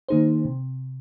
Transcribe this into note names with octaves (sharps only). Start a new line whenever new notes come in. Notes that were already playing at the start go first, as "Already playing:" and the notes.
D#3 A#3 D#4 G#4 C5
C3